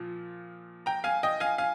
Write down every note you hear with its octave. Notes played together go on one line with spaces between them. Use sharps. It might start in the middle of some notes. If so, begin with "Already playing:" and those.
Already playing: A#2 F3
G5 A#5
F5 G#5
D#5 G5
F5 G#5
F5 G#5